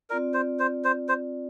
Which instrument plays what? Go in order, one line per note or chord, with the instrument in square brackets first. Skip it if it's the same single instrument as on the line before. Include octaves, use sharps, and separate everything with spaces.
[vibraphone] C4 F4 D5 [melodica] A#4
[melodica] C5
C5
C5
C5